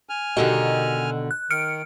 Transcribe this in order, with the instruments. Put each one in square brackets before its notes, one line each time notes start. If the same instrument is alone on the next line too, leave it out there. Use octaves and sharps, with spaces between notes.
[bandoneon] G#5 F6
[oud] B2 D3 D#3 [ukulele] F#4 G4 [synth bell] D#5
[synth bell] F#6
[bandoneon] D#3 [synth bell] F6 C#7 D7